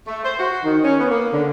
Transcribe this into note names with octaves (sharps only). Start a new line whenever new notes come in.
A3
C5
F#4
D#3
C#4
B3
A#3
D3